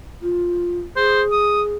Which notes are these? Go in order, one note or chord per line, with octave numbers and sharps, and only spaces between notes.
F4
G#4 C5
D#6